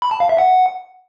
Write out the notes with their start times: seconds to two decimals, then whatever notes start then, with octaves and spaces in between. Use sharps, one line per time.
0.02 B5
0.11 A5
0.20 F5
0.29 E5
0.38 F#5